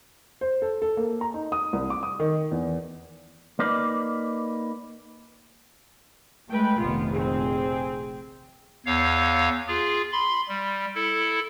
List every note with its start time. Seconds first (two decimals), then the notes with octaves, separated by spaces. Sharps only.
0.41 C5
0.62 A4
0.82 A4
0.97 A#3
1.21 A#5
1.34 D#4
1.52 D#6
1.73 C2
1.90 D6
2.03 D#6
2.20 D#3
2.51 E2
3.59 A#3 D#4 B4 D5
6.50 G#3 A3 B4 G5
6.79 F1 A#1 D#3 B3 F4
7.11 C4 G#4
8.86 E2 C#5 F5
9.68 F4 G#4
10.12 B5 C6
10.49 G3
10.95 E4 A4